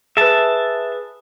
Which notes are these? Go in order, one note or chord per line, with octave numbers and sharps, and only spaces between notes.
G#4 B4 E5 A5